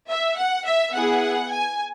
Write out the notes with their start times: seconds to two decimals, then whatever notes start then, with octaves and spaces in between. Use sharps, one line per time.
0.09 E5
0.37 F#5
0.65 E5
0.93 B3 E4 G#4 F#5
1.50 G#5